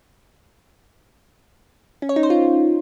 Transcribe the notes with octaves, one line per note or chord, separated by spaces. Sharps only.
C#4
C#5
D#4
C5
F4